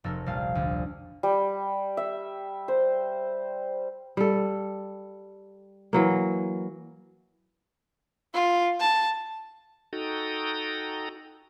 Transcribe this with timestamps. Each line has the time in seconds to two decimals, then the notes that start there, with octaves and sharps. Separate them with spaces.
0.04 F1 A4 A#4
0.26 A#1 G3 F5 A5 C7
0.55 D2
1.23 G3
1.97 E5
2.68 C5
4.17 G3 A4
5.93 E3 F#3 A#3
8.34 F4
8.80 A5
9.93 D#4 F#4 A4 G5 A#5 D#6